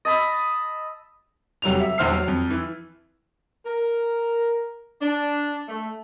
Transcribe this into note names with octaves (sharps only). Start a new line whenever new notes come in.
D#5 A5 B5 E6
F1 F#3 G3 F7
E5
E1 E2 C5 F6 C7
F#3
F2
E3
A#4
D4
A3